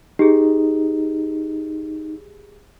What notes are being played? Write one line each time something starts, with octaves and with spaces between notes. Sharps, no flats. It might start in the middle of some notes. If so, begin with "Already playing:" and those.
D#4 G4 G#4